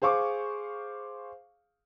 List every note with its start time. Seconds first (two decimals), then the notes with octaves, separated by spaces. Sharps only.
0.02 G#4 C5 F5 C#6 D6